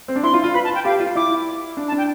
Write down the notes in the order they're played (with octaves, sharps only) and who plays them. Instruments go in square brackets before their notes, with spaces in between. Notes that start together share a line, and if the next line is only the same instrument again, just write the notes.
[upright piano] C4
D4
[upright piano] E4 [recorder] C6
[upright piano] F4
F4
[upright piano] B4 [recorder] B5
[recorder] A5
G5
[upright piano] G4 [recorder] F5
[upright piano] F4
[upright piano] E4 [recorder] D6
[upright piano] D4
[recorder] A5
[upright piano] D4
[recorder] G5